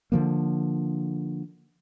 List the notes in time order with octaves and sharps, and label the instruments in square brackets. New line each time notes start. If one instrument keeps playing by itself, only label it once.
[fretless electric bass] D3 F3 A#3